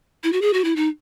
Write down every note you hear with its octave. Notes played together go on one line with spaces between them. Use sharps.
E4
F#4
G#4
F#4
E4
D#4